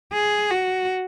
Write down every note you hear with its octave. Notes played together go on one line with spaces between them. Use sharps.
G#4
F#4